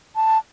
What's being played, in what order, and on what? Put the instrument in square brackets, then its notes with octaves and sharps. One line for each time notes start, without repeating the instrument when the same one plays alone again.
[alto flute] A5